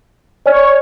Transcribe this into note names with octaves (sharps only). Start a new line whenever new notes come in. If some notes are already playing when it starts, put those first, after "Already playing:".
C#5 D5 G#5 F6